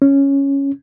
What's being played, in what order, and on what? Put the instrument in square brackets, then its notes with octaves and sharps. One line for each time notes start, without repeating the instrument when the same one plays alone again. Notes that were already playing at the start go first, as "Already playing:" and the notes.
[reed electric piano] C#4